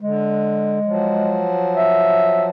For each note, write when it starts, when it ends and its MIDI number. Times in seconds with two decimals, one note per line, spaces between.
0.01 0.79 50
0.01 1.53 56
0.85 2.50 53
0.85 2.50 54
1.75 2.47 76